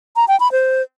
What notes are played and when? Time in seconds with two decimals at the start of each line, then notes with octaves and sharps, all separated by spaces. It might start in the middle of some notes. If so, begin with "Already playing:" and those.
0.16 A#5
0.28 G5
0.40 B5
0.52 C5